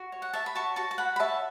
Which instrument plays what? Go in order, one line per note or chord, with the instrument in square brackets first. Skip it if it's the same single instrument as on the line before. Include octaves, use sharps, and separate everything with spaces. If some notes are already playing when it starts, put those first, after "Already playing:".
Already playing: [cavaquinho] F#4
C#5
F#5
C#5 E5 A5
B5
F#4 A5 C#6
F#4 A5 C#6
A5
F#4 F#5 B5
B5
C#5 E5 A5